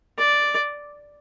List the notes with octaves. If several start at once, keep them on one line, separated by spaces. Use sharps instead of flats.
D5